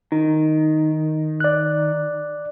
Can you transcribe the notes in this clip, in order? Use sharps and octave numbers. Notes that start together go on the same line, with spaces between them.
D#3 D#4
D5 F#6